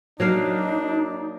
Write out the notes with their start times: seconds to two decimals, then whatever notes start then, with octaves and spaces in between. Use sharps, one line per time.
0.20 F#3 A#3 D4 D#4 F5